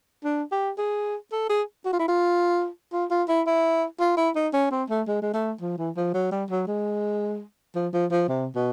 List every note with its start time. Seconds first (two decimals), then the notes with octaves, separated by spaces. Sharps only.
0.24 D4
0.52 G4
0.78 G#4
1.32 A4
1.49 G#4
1.85 F#4
1.93 F4
1.99 E4
2.08 F4
2.93 F4
3.11 F4
3.29 E4
3.47 E4
4.00 F4
4.17 E4
4.36 D#4
4.53 C#4
4.71 C4
4.90 A3
5.08 G#3
5.22 G#3
5.34 A3
5.61 F3
5.78 E3
5.97 F3
6.14 F#3
6.32 G3
6.50 F#3
6.67 G#3
7.75 F3
7.93 F3
8.11 F3
8.28 C3
8.55 B2